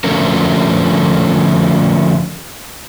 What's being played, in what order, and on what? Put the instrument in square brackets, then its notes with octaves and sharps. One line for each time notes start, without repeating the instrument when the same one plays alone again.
[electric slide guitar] D3 F3 A3 C#4 A#4